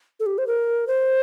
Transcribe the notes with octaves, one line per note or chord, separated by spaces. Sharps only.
A4
G4
C5
A#4
C5